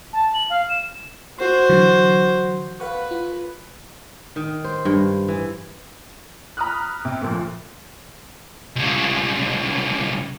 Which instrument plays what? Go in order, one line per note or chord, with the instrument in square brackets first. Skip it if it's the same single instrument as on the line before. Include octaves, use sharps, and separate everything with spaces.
[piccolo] A5
F#7
F5
E7
[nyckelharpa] F#4 C5 [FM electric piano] C6
[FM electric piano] D3 E3 F#3
[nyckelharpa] B4 [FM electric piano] F5 F#5 C#6
[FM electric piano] F4
[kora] D#3
C5
G2
E3
[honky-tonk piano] A#5 B5 D#6 F6 F#6
C3
D2 A#2 F3
[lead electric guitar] C2 C#3